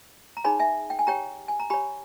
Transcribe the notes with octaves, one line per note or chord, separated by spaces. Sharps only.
A#5
D#4 G#4 C#5 G#5 B5
E5 G#5
G5
G#5
G4 C#5 G5 A#5
G#5
A#5
G4 C#5 G#5 B5